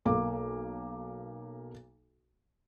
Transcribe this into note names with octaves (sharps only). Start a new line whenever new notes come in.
B1 A#3 D6